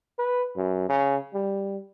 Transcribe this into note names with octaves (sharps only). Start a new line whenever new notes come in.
B4
F#2
C#3
G3